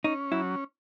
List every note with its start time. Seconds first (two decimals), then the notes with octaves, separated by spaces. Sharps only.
0.04 C#4 D#4
0.32 F#3 E4